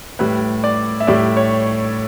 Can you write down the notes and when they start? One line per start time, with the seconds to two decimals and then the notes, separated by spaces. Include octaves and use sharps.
0.19 A2 G3 B4
0.64 D5
1.00 E5
1.07 A2 G3 D5
1.37 C#5